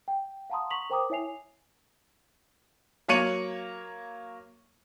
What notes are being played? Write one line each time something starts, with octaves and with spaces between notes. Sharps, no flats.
G5
F5 F#5 A5 A#5 C6 D#6
A#5 C#6 B6 F7 F#7
A#4 C5 G5 A#5 D6 D#6
E4 C#5 E5 G#5 C7 F7
F#3 A#3 C#5 C#7 D#7 F#7